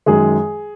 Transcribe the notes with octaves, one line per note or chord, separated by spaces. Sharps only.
F#2 D#3 G#3 G#4